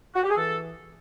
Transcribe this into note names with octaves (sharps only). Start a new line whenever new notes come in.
F#4
G4
G#4
E3 A4